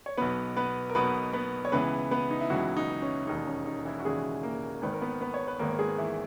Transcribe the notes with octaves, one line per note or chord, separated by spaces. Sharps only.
C#5
B1 B2 B3 B4
B3 B4
A#4
B1 B2 B3 B4
B3 B4
C#5
C#2 C#3 E3 B3 B4
B3 B4
D#4
E4
C#2 C#3 E3 F#3 F#4
D#4
C#4
E1 D#2 C#3 D#4
C#4
D#4
E3 E4
F#4
E1 D#2 C#3 G#3 G#4
A#3 A#4
G#1 G#2 D#3 B4
A#4
B3 B4
B3 B4
C#5
B4
G#1 G#2 D#3 A#3 A#4
G#3 G#4
E3 E4